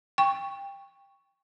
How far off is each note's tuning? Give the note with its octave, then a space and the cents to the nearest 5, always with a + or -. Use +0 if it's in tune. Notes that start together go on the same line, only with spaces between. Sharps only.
G5 +20 C#6 +0